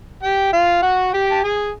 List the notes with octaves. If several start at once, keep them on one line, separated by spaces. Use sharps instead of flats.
G4 G5
F4 F5
F#4 F#5
G4 G5
A5
G#4 G#5